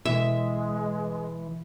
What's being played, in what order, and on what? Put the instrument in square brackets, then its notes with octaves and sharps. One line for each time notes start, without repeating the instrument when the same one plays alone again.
[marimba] B2 [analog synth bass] E3 [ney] G#3 [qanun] E5